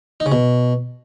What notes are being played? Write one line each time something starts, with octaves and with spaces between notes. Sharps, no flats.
D#4
C#3
B2